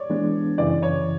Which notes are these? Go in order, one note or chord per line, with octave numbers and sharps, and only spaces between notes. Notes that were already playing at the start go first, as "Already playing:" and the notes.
Already playing: C#5 D5
E3 G#3 B3 D4
F#2 C#3 E3 D5
C#5